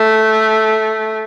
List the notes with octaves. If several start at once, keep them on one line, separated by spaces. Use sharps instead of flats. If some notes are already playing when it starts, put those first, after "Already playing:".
Already playing: A3